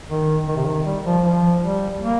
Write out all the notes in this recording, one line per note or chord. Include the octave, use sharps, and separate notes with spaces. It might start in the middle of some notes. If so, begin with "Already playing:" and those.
D#3
D#3
C3
D#3
G3
F3
F3
G3
A#3